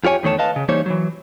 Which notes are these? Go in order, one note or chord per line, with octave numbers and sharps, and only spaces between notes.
F2 F4 G4 C#5 G#5
E2 D#3 A3 C#5 A5
B4 D#5 F5 A5
C#3
E3 G3 A#3 D#4 C5 C#5
E3 F#3